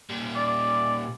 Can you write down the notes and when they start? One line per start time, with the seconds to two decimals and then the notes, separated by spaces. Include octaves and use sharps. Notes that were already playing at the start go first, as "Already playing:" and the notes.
0.10 A#2 G3
0.35 D5